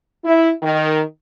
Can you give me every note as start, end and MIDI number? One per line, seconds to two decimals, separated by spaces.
0.25 0.50 64
0.62 1.01 51